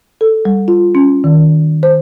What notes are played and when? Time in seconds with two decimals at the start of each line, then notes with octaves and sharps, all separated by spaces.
0.21 A4
0.45 G3
0.68 F4
0.95 C#4
1.24 D#3
1.83 C5